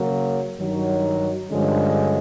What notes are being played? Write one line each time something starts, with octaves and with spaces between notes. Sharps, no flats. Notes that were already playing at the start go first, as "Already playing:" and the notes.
Already playing: C#3 F#3 A#3
G2 D#3 F#3
G2 D3 F3 G#3 C#4